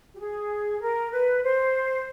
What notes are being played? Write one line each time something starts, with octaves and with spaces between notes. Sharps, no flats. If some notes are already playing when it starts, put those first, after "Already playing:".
G4
G#4
A#4
B4
C5